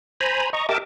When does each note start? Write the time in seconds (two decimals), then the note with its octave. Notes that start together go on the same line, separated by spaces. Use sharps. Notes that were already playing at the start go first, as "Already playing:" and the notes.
0.20 C5 G#5 A#5 B5
0.53 D#5 A#5 C#6
0.69 G4 A#4 D#5 E5 A5 D6